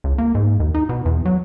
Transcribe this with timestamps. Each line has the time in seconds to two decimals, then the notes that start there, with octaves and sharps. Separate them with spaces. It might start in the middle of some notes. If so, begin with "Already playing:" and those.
0.04 C#2
0.18 A#3
0.35 G#2
0.60 D#2
0.75 D#4
0.89 B2
1.05 E2
1.26 F#3